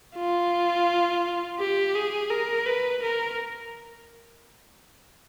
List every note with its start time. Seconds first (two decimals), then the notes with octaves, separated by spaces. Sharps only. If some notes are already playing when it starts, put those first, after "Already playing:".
0.16 F4
1.60 G4
1.94 G#4
2.30 A#4
2.66 B4
3.02 A#4